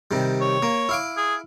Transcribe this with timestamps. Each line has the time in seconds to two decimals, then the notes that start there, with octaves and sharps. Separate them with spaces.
0.11 C3 D#3 G3
0.41 C#5
0.63 A#3
0.89 E4 F5 D6
1.17 G#4